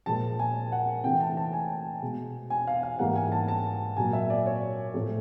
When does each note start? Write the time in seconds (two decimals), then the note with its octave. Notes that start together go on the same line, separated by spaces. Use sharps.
0.06 A#2 F3 G#3 A5
0.39 G#5
0.72 F#5
1.04 C3 E3 A3 G5
1.20 A5
1.37 A5
1.53 G#5
2.02 B2 G#3
2.50 G#5
2.67 F5
2.83 F5
2.99 G#2 E3 G3 A#3 F#5
3.16 G#5
3.32 A5
3.48 A5
3.97 A#2 F#3 A#3 G#5
4.13 E5
4.30 D5
4.46 C#5
4.94 A2 F3 A3